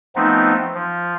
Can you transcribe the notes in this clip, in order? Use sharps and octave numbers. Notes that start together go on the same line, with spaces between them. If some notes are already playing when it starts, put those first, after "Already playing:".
F3 A3 B3 C4 D#4
F3